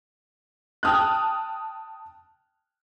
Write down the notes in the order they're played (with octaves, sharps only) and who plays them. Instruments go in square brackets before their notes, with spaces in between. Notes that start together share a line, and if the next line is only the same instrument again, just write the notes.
[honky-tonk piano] G5 A5 D#6 F6 F#6